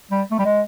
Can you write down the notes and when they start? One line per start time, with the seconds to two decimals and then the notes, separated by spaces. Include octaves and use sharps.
0.11 G3
0.32 A3
0.39 G3
0.46 G#3